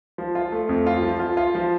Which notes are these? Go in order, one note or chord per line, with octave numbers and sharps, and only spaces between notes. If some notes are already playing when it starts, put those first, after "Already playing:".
F3
F4
A3
F2
F4
F3
F4
F4
F3